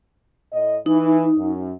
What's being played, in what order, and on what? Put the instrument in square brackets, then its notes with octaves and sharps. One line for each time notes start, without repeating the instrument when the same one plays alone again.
[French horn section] A2 D#5
[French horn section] E3 [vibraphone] D#4
[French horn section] F#2